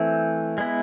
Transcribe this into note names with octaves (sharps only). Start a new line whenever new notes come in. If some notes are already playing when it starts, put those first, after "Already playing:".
Already playing: E3 A3 C4
G#3 B3 E4